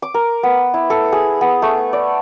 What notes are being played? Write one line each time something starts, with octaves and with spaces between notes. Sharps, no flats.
D6
A#4
B3
E4
A4
G#4
B3
A3
D5